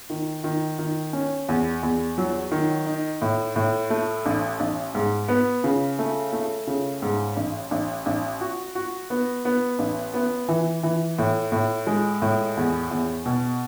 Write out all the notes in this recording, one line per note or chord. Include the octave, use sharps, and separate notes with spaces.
D#3
D#3
D#3
C#4
E2
E2
F#3
D#3
D#4
A2
A2
A3
A1
A1
G#2
B3
C#3
A3
A3
C#3
G#2
A1
A1
A1
F#4
F#4
B3
B3
A1
B3
E3
E3
A2
A2
G#3
A2
E2
E2
B2